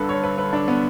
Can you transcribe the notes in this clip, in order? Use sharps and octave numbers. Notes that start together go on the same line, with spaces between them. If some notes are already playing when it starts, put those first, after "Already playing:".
Already playing: G2 D3 A4 B4
C#5
B4
B4
D4
B3